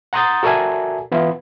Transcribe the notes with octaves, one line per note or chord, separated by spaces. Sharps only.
F#5 A#5 C6 D#6 G6 A6
F#4 A4 A#4 D5 E5 G#5
E3 B3 E4 F4